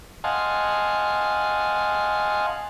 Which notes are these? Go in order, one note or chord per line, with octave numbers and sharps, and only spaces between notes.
D#5 F5 F#5 G#5 A5 C6